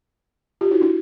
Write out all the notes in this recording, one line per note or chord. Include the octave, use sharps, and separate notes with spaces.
F4 G4
E4 F#4
D4 E4